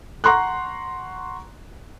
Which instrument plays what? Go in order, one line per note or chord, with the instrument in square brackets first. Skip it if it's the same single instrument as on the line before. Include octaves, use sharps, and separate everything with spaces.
[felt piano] F#5 A#5 C6 C#6 F#6